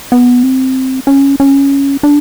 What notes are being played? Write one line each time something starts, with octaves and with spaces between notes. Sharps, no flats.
B3
C4
C#4
C#4
D4